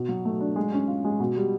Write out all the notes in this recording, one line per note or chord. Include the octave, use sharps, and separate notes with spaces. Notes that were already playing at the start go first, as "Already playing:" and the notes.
Already playing: B2
F#3
A3
D4
G#3
C#4
F4
G#3
B2
G3